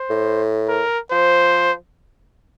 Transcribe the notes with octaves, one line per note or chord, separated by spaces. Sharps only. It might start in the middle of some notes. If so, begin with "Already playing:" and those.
Already playing: C5
A2
A#4
F3 C5